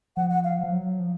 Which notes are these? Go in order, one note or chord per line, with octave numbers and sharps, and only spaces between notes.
F3 F#5
F#5
F5
F3
F#3
F3